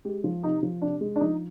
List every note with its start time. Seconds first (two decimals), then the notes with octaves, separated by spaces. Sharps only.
0.05 G#3 G4
0.24 F3
0.43 C3 D#4
0.63 F3
0.82 C3 D4
1.01 G#3
1.16 D4
1.20 F3 D#4